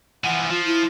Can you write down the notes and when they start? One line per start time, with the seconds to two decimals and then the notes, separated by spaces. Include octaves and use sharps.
0.24 E3 F3 F#5
0.50 F3 F4
0.65 E4